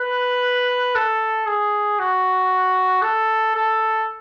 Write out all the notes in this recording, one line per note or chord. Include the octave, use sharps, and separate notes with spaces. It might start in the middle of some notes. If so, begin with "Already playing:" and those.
Already playing: B4
A4
G#4
F#4
A4
A4